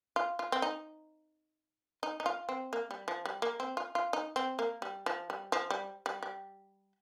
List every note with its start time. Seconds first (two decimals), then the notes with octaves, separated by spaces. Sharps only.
0.16 F4
0.39 F4
0.52 C4
0.62 D#4
2.03 D#4
2.20 D#4
2.26 F4
2.49 C4
2.73 A#3
2.91 G3
3.08 F3
3.25 G3
3.42 A#3
3.60 C4
3.77 F4
3.95 F4
4.13 D#4
4.36 C4
4.59 A#3
4.82 G3
5.06 F3
5.30 G3
5.52 F3
5.70 G3
6.06 G3
6.23 G3